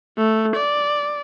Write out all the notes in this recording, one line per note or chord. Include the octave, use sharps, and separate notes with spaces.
A3
D5